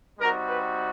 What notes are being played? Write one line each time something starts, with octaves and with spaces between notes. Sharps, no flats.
G3 C4 D#4 F#4 A#4
B4